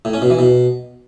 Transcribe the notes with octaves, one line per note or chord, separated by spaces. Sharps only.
A2
C#4
B2
E3
B2